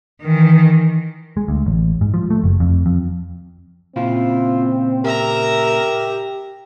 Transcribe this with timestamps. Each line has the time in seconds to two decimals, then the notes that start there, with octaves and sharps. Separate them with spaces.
0.22 D#3 E3
1.37 G#3
1.48 D2
1.66 A1
2.01 G#2
2.14 F3
2.30 A3
2.44 F#1
2.60 F2
2.86 F2
3.96 A#2 C#3 C4 E4 F4
5.05 G4 A#4 E5 A#5